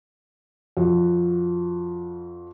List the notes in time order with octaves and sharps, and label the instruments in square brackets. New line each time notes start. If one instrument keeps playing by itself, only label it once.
[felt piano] F2 F#4